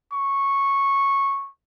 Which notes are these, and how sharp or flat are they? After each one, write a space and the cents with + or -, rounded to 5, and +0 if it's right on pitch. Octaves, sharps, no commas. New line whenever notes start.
C#6 -10